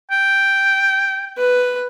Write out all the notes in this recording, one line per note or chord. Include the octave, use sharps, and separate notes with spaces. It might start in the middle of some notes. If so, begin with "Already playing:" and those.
G5
B4